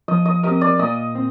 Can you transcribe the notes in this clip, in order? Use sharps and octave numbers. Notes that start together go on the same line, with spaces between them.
F3 D#5
D#5
C4 G4 A#4 D#5
D5
A#2 D#5
C4